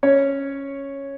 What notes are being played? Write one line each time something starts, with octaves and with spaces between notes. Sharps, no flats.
C#4 C#5